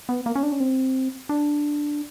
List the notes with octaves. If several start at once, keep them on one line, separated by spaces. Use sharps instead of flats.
B3
A#3
C#4
D4
C#4
C4
D4